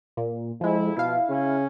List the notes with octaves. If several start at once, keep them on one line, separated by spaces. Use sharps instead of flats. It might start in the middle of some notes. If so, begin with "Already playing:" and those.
A#2
F2 F3 G#3 E4
B2 F3 E4 F5
C#3 C#4